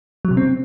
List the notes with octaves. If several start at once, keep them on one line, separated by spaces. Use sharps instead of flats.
F#3
C3
C4